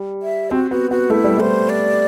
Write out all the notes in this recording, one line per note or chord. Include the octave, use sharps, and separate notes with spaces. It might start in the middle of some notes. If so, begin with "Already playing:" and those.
Already playing: G3
E5
C4 F#4
B3 F#4
B3 F#4
A3 E4
G3
A3 C5
D5